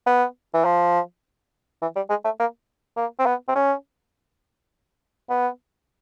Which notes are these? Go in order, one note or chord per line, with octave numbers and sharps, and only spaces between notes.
B3
E3
F3
E3
G3
G#3
A3
A#3
A#3
C4
B3
C4
C#4
B3